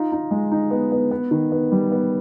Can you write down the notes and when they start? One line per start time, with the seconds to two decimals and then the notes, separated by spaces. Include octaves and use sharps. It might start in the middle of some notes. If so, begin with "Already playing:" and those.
Already playing: D#4 F4
0.12 D#4
0.31 G#3
0.51 D#4
0.71 B3
0.92 B3
1.11 B3
1.31 D#3
1.52 B3
1.72 G3
1.92 B3